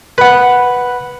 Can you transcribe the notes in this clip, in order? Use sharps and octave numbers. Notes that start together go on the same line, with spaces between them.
B4 F#5